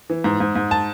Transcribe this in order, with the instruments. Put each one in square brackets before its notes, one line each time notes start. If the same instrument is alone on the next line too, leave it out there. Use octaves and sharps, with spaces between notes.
[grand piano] E3
G#2
G#2
G#2
A5